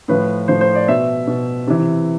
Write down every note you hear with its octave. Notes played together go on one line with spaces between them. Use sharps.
A2 F3 B4
A2 F3 C5
C5
D5
B2 E5
B2
C3 E3